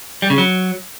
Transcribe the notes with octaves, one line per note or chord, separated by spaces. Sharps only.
G3
C#3
F#3